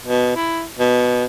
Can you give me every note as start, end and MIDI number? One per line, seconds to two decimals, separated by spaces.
0.07 0.35 47
0.36 0.64 64
0.79 1.25 47